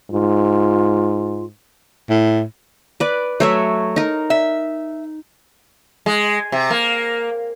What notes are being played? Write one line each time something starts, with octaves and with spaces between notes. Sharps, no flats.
G#2 F4
A2
B4 D5
F#3 A3 C#5 E5
D#4 A#4
E5
G#3
C3
A#3